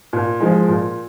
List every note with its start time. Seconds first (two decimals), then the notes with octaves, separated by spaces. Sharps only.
0.13 A#2
0.40 F3 G#3
0.68 A#2